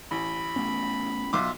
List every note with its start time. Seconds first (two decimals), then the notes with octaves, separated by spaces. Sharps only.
0.11 A1 B5
0.56 A3 B3 C#4
1.33 B1 F4 E5 D6